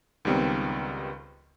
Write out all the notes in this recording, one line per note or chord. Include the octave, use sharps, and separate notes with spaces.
C#2 D#3 G3 B3 C4